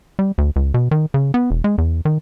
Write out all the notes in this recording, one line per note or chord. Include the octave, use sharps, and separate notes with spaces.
G3
D2
C#2
B2
D#3
C#3
B3
E1
G#3
E2
D#3